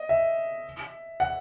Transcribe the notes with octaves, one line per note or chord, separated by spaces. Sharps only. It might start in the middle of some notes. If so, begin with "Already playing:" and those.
Already playing: D#5
E5
F#5